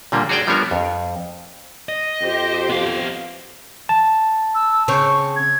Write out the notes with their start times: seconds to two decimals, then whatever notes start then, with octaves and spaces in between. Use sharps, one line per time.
0.12 A#2 D3 G3 A#3
0.29 F#4 G#4 C#5 D5 G5
0.47 F3 G3 B3 D4 A#4 C#5
0.71 F2
1.89 D#5
2.21 F2 G4 C5
2.70 B3 F5
3.89 A5
4.55 E6
4.88 C#3 C4 C#5 C#6
5.36 G#6